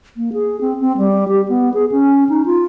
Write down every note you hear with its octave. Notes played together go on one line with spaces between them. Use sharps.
A#3
G#4
C4
C4
G3
G4
B3
G#4
C#4
D#4
F4